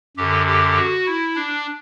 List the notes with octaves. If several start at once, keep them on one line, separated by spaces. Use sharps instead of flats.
F#2 D3 G4
G4
F#4
E4
D4